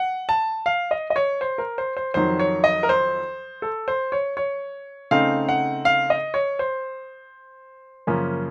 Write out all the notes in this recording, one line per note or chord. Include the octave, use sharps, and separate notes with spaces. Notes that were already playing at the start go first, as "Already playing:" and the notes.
Already playing: F#5
A5
F5
D#5
D#5
C#5
C5
A#4
C5
C5
F2 D#3 F#3 C5
C#5
D#5
A#4
C5
A4
C5
C#5
C#5
C#3 A3 C4 D#4 F5
F#5
F5
D#5
C#5
C5
F#2 C#3 F3 A#3 C#4